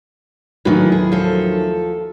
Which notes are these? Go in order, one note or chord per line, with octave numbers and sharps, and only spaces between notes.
D#2 D#3 E3 F#3 A3
G#4
F3 A4